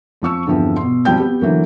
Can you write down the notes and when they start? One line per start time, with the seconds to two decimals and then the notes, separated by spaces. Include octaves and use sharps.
0.22 F2 F3 C#6 E6
0.46 E2 G2 D3 E3 F3 C4
0.77 B2 C6
1.05 G#1 F3 G3 G5 G6
1.19 B3 G4
1.41 D3 E3 F#3 A#3